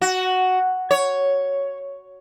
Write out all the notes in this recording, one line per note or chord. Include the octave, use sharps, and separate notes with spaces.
F#4
C#5